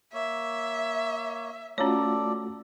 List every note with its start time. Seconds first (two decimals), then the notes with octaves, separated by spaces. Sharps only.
0.13 A#3 C#5 E5
1.78 A3 C#4 F4 F#4 A4 C#5 D5